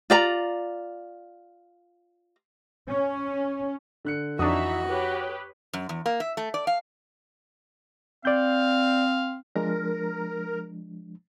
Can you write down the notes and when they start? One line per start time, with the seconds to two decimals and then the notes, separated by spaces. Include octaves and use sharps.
0.10 F4 D5 A#5
2.88 C#4
4.05 D3 F#6 C#7
4.39 F2 E3 D4 D#4 F#4 E5 C#6 D#6
4.86 G4 B4 C#5
5.73 F#2
5.89 E2
6.06 A#3
6.20 E5
6.37 A3
6.54 D5
6.67 F5
8.25 C4 D5 F5 G6
9.56 F3 G#3 D4 A#4